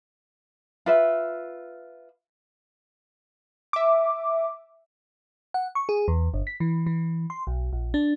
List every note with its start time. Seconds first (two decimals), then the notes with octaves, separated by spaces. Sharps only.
0.86 F4 B4 E5
3.73 E5 D6
5.54 F#5
5.75 C#6
5.89 G#4
6.08 E2
6.34 G1
6.47 B6
6.60 E3
6.86 E3
7.30 C6
7.47 B1
7.73 A#1
7.94 D4